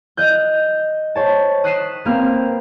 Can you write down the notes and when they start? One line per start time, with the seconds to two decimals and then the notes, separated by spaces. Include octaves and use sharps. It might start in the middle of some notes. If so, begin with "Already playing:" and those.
0.17 D#5 F#6 G6
1.15 C5 C#5 A5
1.64 D#6 F#6 B6 C7 D#7 E7
2.05 A#3 C4 B4 F6